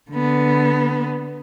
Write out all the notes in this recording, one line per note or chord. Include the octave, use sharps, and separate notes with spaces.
D3 B3